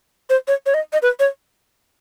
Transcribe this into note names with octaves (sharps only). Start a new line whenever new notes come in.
C5
C#5
C#5
D#5
D#5
B4
C#5